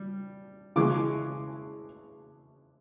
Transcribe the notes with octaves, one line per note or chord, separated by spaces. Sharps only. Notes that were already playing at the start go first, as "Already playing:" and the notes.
Already playing: G3
C#3 E3 G#3 D6